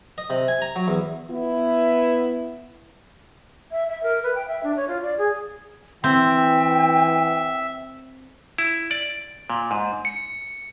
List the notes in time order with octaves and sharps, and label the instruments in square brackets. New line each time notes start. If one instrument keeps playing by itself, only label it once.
[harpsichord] D#5
C3
G#5
A#5
F#3
E2
[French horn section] B3 E4
[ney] E5
E5
A#4
B4
G5
E5
D4
C#5
F4
D5
G#4
[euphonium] E3 [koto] C4 [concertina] E5 [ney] G5
[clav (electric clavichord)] E4
D5
A#2
G#2
[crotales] C#7